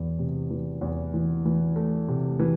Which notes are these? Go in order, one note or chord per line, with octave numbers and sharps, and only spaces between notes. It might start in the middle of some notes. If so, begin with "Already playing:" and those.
Already playing: E2 E3
C3
E3
E2
E3
E3
A3
C3
E3